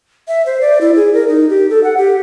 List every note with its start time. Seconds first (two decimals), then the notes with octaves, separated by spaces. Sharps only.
0.28 E5
0.46 C5
0.61 D5
0.81 E4
0.96 G#4
1.14 A#4
1.28 D#4
1.49 G4
1.70 A4
1.84 F#5
1.98 G4